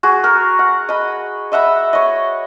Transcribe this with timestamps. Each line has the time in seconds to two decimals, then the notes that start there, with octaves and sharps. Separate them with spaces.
0.03 F#4 G#4
0.24 A#4
0.59 F#5
0.89 D#5 B5
1.52 D#5 E5 F#5 B5
1.93 C#5 D#5